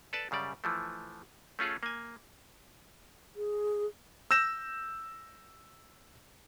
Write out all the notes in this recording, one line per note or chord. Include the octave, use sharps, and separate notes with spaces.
A4 B4 D5 A5
F#2 C#3 G3 D5
E3 F3 A3
A3 C#4 F4 G#4 A4
A#3 G#5
G#4
E6 G6 A#6 E7